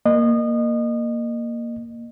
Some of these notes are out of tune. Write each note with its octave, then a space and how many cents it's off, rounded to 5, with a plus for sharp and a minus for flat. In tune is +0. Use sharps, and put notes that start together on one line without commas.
A#3 +0 D#5 -30